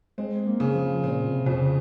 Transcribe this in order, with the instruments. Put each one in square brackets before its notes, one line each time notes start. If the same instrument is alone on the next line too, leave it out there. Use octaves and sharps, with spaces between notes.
[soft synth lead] G#3 [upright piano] C4
[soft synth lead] A#3
[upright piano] C#3
[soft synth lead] F3
[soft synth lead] A#2 [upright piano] C4
[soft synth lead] C3
[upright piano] F2
[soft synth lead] C#3